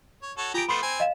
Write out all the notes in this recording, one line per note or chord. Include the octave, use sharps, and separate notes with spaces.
C#5
F#4 A4 C#5
F4 G4 G#4 A#5 D7
F3 A3 B3 B5 C6 C7
C4 G#5
D#5 F5 E7